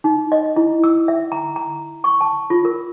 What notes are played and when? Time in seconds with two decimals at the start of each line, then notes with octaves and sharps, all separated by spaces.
0.04 D#4
0.32 D#5
0.56 E4
0.84 E6
1.08 E5
1.32 A#5
1.56 A#5
2.04 C#6
2.21 A5
2.50 F4
2.65 A#4